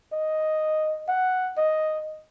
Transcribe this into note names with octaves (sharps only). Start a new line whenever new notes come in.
D#5
F#5
D#5